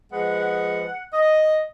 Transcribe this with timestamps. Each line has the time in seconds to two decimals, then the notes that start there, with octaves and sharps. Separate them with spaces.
0.12 F3 G#3 B3 F#5
1.13 D#5